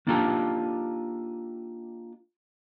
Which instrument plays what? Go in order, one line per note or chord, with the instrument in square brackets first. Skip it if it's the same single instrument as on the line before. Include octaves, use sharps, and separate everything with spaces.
[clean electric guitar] A#3 D4 D#4 F4 G4 A4